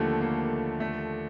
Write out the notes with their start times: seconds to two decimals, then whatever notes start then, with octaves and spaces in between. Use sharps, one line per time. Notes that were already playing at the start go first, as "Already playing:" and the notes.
Already playing: D#2 D3 F3 G3 A3
0.21 A#3
0.80 A3